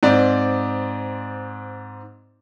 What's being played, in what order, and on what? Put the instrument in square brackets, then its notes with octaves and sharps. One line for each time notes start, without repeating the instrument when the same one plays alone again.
[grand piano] G#2 C4 D5